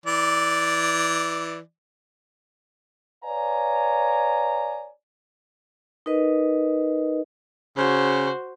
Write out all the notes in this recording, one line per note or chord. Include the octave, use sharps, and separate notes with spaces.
E3 D5
B4 C#5 D5 F5 G#5 A#5
D#4 A#4 B4 D#5
C#3 F#4 C5